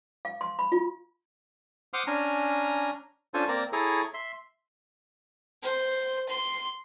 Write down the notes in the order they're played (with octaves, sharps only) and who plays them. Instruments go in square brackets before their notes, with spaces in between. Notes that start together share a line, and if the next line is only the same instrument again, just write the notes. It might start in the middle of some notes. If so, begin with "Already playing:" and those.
[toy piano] F5
C6
B5
F4
[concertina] C5 F#5 C6 D6 D#6 F6
C#4 D4 G#5 A#5 F6
C#4 D4 F4 A4 C5 G#5
A#3 C4 A#4 D5 A#5
E4 G#4 A4 C#5 A#5
E5 C6
[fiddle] C5
C6